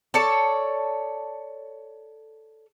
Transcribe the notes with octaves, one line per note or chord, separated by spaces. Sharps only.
A4 C#5 D5 A5